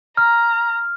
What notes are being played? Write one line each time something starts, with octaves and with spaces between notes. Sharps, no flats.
A#5 F6